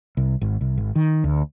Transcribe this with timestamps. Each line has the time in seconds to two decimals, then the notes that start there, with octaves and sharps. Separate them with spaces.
0.17 C2
0.41 G#1
0.61 C2
0.78 G#1
0.95 D#3
1.24 D2